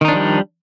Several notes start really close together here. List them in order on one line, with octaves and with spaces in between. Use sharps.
D#3 D#4 D4 F3 G3